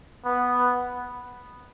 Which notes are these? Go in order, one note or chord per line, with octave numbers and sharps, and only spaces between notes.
B3